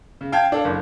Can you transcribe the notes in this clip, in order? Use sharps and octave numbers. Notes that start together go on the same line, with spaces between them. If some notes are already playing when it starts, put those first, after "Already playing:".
C#3
F5 G5 A5 G#6
D4 A4 F5
F#1